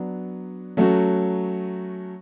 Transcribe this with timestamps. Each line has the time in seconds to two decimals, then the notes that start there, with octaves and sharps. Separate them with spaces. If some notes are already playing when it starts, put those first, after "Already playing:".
Already playing: F#3 B3 D4
0.77 F#3 A3 C#4 F#4